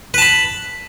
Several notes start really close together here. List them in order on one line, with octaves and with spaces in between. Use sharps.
B4 A5 B5